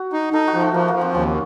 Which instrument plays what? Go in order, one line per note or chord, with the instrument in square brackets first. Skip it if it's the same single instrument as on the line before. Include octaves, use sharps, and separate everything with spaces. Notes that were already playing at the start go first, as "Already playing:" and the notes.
Already playing: [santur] F#4
[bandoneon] D#4
[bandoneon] D#4 [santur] A4
[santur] F#4
[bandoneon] F3
[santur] A3
[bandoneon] F3 [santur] A#3
[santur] A#3
[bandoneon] F3
[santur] C4
[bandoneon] D#2 [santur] C#4